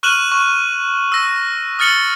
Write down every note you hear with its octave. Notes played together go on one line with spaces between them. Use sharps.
C#6 F6 F#6 D#7 E7 F#7
C#6
E6 A#6
D#6 F6 A6 C#7 F#7 G7